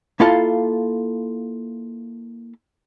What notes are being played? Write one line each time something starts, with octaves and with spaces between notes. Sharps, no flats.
A#3 E4 F4 A4 F5 A5